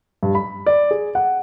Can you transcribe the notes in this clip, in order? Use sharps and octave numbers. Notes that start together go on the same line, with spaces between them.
G2
B5
D5
G#4
F#5